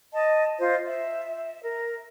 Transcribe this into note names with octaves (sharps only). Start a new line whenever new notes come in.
D#5 A5
F4 C5 D#5
E5
A#4